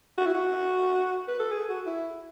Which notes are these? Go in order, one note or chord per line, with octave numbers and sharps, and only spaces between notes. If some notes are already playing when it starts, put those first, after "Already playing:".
F#4
E4
F#4
B4
A4
G#4
F#4
E4